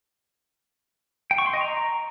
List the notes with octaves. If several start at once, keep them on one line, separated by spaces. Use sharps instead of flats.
G5
C#6
C6
D#5
A#5